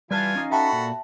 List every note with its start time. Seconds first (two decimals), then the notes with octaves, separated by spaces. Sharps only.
0.11 E3 G3 F4 B4 G#5 A5
0.35 C#4 D#4 F5
0.51 F#4 A4 E5 G5 A5 B5
0.72 A#2